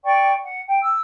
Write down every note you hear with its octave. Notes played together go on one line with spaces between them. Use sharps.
D5 G5 C#6
F#5
G5
E6